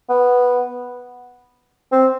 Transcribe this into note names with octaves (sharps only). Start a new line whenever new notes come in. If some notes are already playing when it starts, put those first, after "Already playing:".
B3
C4